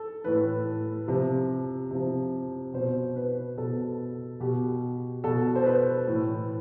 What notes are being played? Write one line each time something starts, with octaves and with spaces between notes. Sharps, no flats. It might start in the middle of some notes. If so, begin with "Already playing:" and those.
Already playing: A4
A2 E3 B4
C3 F3
C3 F3
B2 C5
B4
B2 A4
B2 G4
B2 A4
C5
B4
A2 E3